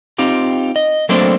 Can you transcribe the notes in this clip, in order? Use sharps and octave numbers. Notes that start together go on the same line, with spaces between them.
C4 D#4 F4 G4
D#5
F#3 A3 A#3 C4 D4 C5